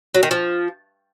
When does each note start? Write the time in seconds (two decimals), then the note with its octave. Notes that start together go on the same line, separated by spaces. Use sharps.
0.15 F#3
0.23 D#3
0.31 F3